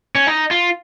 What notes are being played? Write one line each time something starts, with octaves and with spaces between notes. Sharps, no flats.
C#4
D#4
F4